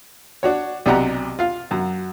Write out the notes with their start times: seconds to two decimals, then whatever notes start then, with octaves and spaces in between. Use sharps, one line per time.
0.43 D4 F#4 C#5
0.86 B1 C3 D4 G4 F#5 A#5
1.39 F4 F5
1.71 F#2 F#3